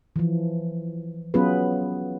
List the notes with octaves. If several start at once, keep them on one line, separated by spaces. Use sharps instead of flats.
E3 F3
F#3 B3 C#4 F4 G#4 B4